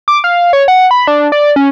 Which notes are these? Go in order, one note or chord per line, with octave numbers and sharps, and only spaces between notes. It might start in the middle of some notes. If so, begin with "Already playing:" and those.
D6
F5
C#5
F#5
B5
D4
D5
C#4